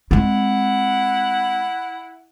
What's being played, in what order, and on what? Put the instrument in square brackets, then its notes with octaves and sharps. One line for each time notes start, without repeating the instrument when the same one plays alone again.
[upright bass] G#3 C4 [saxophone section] E4 F#5